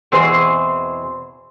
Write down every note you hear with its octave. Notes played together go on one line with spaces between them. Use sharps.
E2 B2 C4 G#4 C5